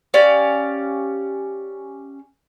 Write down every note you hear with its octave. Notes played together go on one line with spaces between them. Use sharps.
C#4 G4 D5 F5